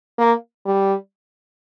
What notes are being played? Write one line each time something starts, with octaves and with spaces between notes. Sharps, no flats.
A#3
G3